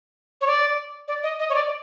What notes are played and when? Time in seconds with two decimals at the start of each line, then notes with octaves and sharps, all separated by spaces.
0.41 C#5
0.47 D5
1.08 D5
1.23 D#5
1.39 D#5
1.49 C#5
1.54 D5